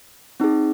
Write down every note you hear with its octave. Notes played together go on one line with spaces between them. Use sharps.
C4 D#4 G#4